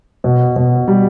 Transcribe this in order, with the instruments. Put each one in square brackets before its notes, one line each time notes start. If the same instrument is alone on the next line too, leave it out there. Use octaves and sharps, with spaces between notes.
[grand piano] B2
B2
G3